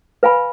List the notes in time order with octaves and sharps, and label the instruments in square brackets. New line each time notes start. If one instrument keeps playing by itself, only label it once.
[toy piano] B4 F5 G#5 B5